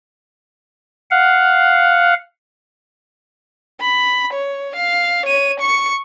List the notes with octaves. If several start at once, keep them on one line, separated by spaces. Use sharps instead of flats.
F5 F#5
B5
C#5
F5
C#5 D#7
C#6 C#7